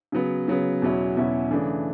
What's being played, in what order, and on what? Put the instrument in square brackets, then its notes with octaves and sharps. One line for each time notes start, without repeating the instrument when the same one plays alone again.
[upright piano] C#3 F#3 B3
C#3 F#3 B3
E2 B2 F#3 C#4 E4
E2 B2 F#3 C#4 E4
C#3 E3 A3 D4